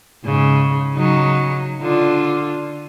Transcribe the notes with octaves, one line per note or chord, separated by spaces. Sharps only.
G#2 C#3
C#3 F#3 D#4
D3 D4 F4